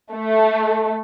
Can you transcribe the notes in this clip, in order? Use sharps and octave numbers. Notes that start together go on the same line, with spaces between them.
A3